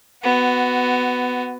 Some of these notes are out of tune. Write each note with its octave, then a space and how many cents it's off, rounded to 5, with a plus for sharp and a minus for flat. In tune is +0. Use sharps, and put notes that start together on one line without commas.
B3 +15 F#4 +0